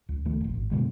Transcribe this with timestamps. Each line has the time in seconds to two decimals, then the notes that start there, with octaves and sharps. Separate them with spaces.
0.09 C#2
0.25 C#2 D#3 A3
0.40 F1 A#1
0.54 G#1
0.71 F#2 B2 D3 G#3